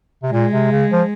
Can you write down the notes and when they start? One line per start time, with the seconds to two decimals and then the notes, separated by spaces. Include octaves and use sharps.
0.23 C3
0.32 A#2 G#3
0.52 C3
0.71 C#3
0.92 F3